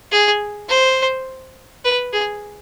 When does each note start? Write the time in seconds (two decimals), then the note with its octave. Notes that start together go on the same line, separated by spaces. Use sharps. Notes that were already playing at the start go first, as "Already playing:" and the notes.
0.12 G#4
0.69 C5
1.85 B4
2.13 G#4